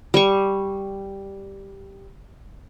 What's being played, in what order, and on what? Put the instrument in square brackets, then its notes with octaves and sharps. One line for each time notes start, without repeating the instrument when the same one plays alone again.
[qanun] G3 C#6